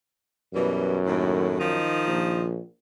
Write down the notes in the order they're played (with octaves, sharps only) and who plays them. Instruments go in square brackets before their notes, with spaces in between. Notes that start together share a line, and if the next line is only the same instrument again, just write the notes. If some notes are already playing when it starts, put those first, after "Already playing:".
[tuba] F#2 [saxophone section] B2 E3 G3
[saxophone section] D#2 A2
D#3 F3 D#4
[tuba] A#1